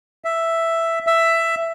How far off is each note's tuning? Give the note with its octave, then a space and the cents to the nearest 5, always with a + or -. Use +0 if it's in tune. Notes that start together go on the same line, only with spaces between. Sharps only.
E5 +5
E5 +10